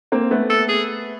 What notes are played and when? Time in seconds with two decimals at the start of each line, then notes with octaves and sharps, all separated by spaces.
0.12 A#3 C4
0.31 A3 B3
0.50 A4
0.69 G#4